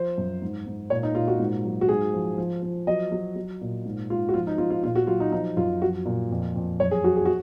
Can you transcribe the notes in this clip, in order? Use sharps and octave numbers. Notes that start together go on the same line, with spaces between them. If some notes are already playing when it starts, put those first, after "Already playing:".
Already playing: F3 C5
F#2
G#2
G#2
A#2 C#5
D#4
A#2 F4
F#4
G#2
F#3
F#4
G#2 G#4
F3
F3
F3
F#3 D#5
F#3
F#3
A#2
G#2
G#2 F4
F#4
F3 F4
D#4
F3 F4
F4
A#2 F4
F#4
F#3 F4
D#4
F3 D#4
F#2 F4
F3 F#4
A#2
F2
F2
F#2 C#5
G#4
F#3 F#4
G#4
F#4